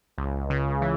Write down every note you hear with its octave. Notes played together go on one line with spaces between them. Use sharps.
C#2
C#3
E3